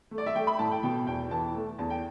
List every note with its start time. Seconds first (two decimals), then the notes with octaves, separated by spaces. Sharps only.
0.11 A3
0.18 D5
0.26 E5
0.35 A3 G5
0.47 B5
0.59 A2 A5
0.71 G5
0.83 B2 G5
1.07 E2 G5
1.31 E3 A5
1.55 A3
1.79 E2 A5
1.90 G5